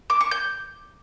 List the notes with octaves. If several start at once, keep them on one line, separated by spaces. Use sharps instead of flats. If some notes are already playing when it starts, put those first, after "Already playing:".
D6
C#6
G6